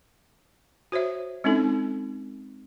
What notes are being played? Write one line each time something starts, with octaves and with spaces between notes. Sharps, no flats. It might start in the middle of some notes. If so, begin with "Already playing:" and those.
F#4 C5 C#5 E5
G#3 C4 C#4 D#4 E4 A4